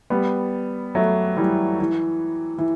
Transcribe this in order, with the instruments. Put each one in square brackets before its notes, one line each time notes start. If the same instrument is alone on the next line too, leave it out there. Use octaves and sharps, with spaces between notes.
[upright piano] G3 B3
F#3 A3
E3 G3
E3
E3